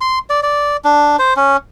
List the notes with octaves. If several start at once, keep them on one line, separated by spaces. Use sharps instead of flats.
C6
D5
D5
D4
C5
C#4